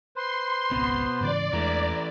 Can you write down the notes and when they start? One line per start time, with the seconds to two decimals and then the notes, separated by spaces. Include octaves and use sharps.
0.16 B4 C5 C6
0.71 G#1 C#2 B2 C4
1.21 G#2 C#3 E3 D5
1.53 E2 E3 G#3 A3 D4 A#5